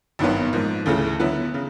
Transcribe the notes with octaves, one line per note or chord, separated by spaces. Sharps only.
G#1 G2 D#3 F#3 B3
G#2 F3 A#3
D2 C#3 E3 A3
D3 F#3 B3 E4
C#3